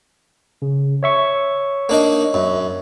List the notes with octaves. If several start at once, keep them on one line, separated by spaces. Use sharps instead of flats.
C#3
C#5 E5 C#6
A#3 D4 D#4
F#2